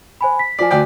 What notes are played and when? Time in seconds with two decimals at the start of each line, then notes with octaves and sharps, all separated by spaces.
0.21 C5 G#5 B5
0.39 B6
0.59 F3 D5 G#5 B6
0.71 D2 D5 G5